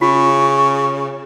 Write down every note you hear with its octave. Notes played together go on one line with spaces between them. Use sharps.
C#3 F4 C#6